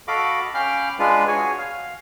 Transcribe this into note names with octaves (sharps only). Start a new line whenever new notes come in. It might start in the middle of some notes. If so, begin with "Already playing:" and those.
F#4 A4 D#5 F5 B5 D6
C#4 F5 G5 B5 D6 F6
G#3 D4 F4 B4
F#4 G#4 C#5 G#5
F5